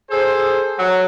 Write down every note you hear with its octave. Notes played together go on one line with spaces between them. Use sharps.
G#4 A4 C5
F#3